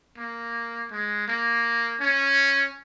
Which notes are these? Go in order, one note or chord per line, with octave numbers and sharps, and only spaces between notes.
A#3
G#3
A#3
C#4